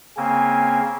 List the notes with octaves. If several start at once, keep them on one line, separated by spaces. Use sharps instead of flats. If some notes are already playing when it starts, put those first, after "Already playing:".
C#3 A#3 C4 G#5